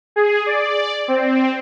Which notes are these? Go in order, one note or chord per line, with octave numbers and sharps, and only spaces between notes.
G#4
D5
C4